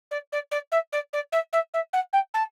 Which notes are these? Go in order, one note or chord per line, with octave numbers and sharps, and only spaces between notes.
D5
D5
D5
E5
D5
D5
E5
E5
E5
F#5
G5
A5